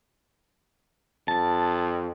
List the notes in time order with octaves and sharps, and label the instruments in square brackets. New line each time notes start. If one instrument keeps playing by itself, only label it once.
[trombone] F2 [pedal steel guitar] A5